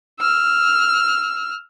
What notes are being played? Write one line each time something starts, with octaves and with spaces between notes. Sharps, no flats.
E6 F6